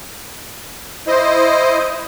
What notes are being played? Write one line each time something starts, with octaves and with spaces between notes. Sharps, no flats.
E4 C5 D#5